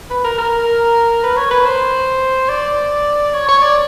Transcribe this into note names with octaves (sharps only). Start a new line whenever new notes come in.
B4
A#4
A#4
B4
C#5
B4
C5
D5
C#5
C#5
D5